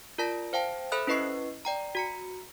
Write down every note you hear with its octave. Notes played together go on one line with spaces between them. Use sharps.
F4 A#4 D5 A5 A#6
C5 F5 G5 A5
A4 C5 E5 B5 D#6 F#6
C#4 E4 B4 D#5 C#6 C7
D5 G5 A#5
F#4 A#5 C#7